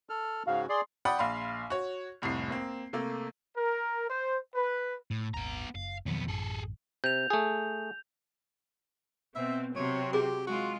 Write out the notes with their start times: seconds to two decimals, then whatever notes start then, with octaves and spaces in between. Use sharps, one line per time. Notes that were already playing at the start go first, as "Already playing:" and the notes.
0.09 A4 F6
0.47 G#2 C#3 F#4 F5
0.69 G#4 D5 C6
1.05 D5 F#5 G5 B5 D#6
1.19 A#1 F5 B5 C6
1.70 F#4 C#5
2.22 F1 C2 A2 C7
2.50 A#3 C4
2.93 C3 A3 A#3
3.56 A#4
4.09 C5
4.55 B4
5.11 A2
5.34 D#1 G#1 B3 A#5
5.75 F#1 F5
6.06 F2 B2 D#3 F#3 B3
6.28 A1 F#2 G#4 A4
7.04 C3 G6 F7
7.30 A3 G#4
9.35 B2 C4 E5
9.76 C3 F#3 C4 C#5
10.13 G4 G#4 D6
10.47 G#3 F4 F#4